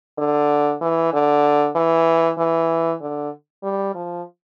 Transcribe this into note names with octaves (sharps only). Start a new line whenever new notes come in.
D3
E3
D3
E3
E3
D3
G3
F3